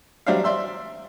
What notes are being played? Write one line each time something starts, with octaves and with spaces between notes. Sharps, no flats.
F#3 G3 D4 C5 E5 F5
D5 E5 C6 E6